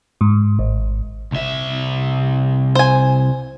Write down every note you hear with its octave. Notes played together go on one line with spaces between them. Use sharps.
G#2
G#1
C2 E5
C5 G#5